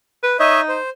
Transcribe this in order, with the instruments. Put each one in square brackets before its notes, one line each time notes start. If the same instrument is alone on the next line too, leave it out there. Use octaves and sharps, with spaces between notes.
[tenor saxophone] B4
[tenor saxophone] D#4 [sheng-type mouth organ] C#5 D#5 E5
[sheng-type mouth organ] C5